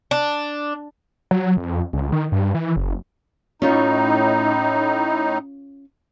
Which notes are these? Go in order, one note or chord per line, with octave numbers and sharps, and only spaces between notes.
D4
F#3
F2
C#2
D#3
G2
E3
F#1
A2 C#4 D#4 F4 C#5